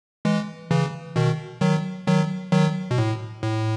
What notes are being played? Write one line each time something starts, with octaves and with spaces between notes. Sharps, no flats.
E3 G#3
C#3 E3
B2 D#3
D#3 F#3
D#3 F#3
D#3 F#3
B2
A2
A2